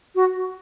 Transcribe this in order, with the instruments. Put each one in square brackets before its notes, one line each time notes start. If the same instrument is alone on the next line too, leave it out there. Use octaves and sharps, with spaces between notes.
[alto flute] F#4